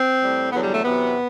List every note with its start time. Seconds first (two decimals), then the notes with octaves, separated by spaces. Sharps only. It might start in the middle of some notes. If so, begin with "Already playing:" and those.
Already playing: C4
0.21 A2 G3
0.52 E2 D3 F#3 B3
0.63 G3
0.74 A3
0.84 E2 C3 F#3 B3